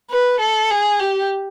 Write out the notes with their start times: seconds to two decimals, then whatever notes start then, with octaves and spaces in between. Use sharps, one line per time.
0.10 B4
0.40 A4
0.70 G#4
1.00 G4